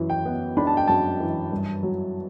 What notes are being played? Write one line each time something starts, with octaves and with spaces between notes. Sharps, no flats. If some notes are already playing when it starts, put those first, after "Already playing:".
Already playing: F#2 E3
G5
B3
D4 B5
A5
G5
F#2 A5
E3
G2
F#3